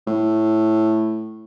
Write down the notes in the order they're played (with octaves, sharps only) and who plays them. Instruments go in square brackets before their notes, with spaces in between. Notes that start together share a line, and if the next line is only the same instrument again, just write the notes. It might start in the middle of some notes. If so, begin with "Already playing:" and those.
[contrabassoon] A2